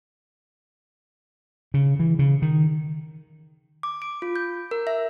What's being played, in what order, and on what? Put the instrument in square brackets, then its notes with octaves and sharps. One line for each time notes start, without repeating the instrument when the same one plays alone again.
[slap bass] C#3
E3
C#3
D#3
[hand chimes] D6
D7
F4
G6
A#4
E5